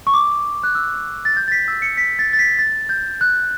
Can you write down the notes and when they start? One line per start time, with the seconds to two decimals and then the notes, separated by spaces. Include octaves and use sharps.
0.07 C#6
0.14 D6
0.63 F#6
0.75 E6
1.25 A6
1.37 G6
1.48 A6
1.52 B6
1.68 E6
1.82 C#7
1.97 B6
2.19 A6
2.33 A6
2.39 B6
2.59 A6
2.89 G6
3.21 F#6